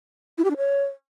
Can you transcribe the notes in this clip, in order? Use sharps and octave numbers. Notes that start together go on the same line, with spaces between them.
E4
G4
D4
C#5